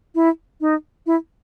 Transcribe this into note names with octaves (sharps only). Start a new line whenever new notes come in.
E4
D#4
E4